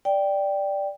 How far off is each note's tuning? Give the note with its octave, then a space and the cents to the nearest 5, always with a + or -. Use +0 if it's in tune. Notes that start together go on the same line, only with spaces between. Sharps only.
D5 +0 G5 +0